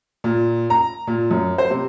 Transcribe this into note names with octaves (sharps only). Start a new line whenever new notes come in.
A#2
A#5
A#2
F#2
C5
C3